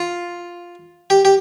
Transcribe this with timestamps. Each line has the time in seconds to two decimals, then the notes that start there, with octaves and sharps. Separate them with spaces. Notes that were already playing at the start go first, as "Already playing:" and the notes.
Already playing: F4
1.10 G4
1.25 G4